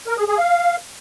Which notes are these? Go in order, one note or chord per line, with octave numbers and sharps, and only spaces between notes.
A#4
G#4
G#4
F5